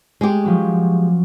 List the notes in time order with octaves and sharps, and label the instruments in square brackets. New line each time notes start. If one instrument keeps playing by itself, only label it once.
[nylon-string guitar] G#3 G4
[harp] F3 F#3 C#4